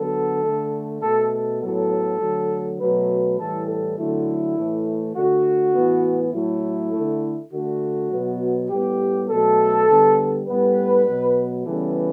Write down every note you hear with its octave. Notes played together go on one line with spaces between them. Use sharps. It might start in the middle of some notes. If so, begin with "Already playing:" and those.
Already playing: D3 F#3 B3 A4
D3 A3
B2 A3 A4
A4
A2 F#3 B3 A4
D3 F#3 A3
B2 F#3 A3 B4
A2 E3 G3 A4
A4
D3 F#3 A3 E4
A2 E3 A3
D3 A3 F#4
A2 E3 B3
A2 F#3 A3 E4
D3 A3
D3 A3 F#4
B2 F#3 B3
A2 G3 B3 G4
B2 F#3 A3 A4
D3 G3 B3
A2 G3 B3 B4
B2 F#3 B3
C#3 E3 G3 B3 A4